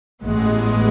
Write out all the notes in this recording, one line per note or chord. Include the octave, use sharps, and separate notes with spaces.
A1 A2 G#3 B3